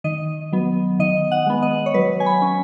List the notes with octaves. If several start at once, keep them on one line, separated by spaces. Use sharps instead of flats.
D#3 D#5
F#3 B3
D#3 D#5
F#5
G#3 B3
D#5
C#5
F#3 B4
G#5
B5
C#4